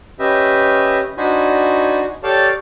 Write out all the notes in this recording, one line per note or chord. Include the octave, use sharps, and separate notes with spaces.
C#4 G4 B4 D#5 E5
D4 D#4 F#4 C5 G#5 B5
G4 A4 C#5 D5 F5 A5